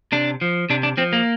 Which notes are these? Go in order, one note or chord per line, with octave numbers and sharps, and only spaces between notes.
C3 D4
F3
C3 D4
D4
F3 C4
A#3